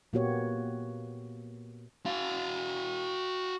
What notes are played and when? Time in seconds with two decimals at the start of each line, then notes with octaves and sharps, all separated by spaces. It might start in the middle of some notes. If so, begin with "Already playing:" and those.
0.13 A#2 A#3 B3 F#4 G4 C#5
2.06 F#4 F5